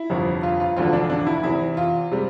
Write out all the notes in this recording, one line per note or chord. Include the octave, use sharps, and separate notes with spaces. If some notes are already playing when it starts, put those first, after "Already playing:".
Already playing: E4
G1 F2 C3
F4
F4
E1 D2 D3 F3 F4
D4
D4
E4
E2 C3 E3 E4
F4
C3 G3